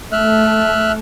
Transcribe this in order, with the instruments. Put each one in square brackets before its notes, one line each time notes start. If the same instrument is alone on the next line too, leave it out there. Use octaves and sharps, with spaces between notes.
[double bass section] A3 [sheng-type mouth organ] E5 F6 F#6